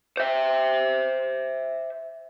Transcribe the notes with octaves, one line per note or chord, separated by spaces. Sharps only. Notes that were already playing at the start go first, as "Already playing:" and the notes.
C5 E5